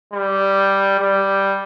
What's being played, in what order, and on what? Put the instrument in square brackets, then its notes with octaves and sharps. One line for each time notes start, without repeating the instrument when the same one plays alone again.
[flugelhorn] G3
G3